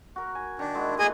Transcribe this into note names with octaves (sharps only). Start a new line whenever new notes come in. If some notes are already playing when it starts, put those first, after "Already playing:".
F#4 A#4
G#5
D#3 D4
G#3 E4 F#4
A#2 E3 A3 G#4 D#5 G#5